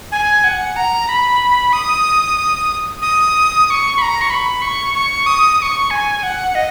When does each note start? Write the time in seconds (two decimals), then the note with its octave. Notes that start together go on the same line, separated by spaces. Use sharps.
0.12 G#5
0.44 F#5
0.76 A#5
1.09 B5
1.73 D#6
3.02 D#6
3.66 D#6
3.70 C#6
3.98 B5
4.02 A#5
4.21 C#6
4.30 B5
4.62 C#6
4.94 C#6
5.26 D#6
5.58 D#6
5.62 C#6
5.91 G#5
6.23 F#5
6.55 D#5